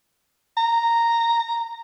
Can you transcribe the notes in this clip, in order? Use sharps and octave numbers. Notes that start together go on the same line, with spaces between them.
A#5